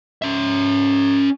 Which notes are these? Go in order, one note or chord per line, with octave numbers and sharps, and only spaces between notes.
C#4 E5